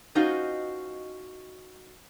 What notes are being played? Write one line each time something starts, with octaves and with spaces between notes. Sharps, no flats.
C#4 D#4 F4 F#4 C5 D#5